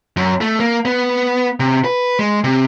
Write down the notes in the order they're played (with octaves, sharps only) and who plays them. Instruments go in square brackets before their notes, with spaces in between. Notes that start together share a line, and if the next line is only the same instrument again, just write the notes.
[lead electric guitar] F#2
A3
A#3
B3
C3
B4
G#3
C3